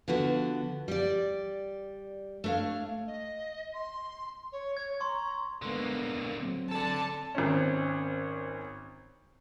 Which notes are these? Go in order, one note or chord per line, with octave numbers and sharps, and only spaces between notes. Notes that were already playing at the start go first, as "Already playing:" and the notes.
D3 F3 B3 F#4
G3 D5
A3 D4 B4 C#5 F5
D#5
C6
C#5
C#5 G#6
A#5 C6 C#6
D3 G#3 A#3 B3
F#3 C4
A4 D5 A5
G#1 C4 C#4